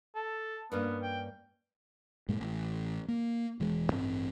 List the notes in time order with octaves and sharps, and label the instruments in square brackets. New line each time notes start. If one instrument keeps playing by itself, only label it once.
[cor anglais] A4
[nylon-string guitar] G2 A#3 C#4 [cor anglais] B3
[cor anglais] G5
[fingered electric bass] G2 A#2 G#3
A1
A#3
E1 E3 G#3
A1 G2 C4